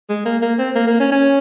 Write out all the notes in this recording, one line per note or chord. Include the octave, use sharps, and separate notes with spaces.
G#3
A#3
A#3
C4
A#3
A#3
C#4
C#4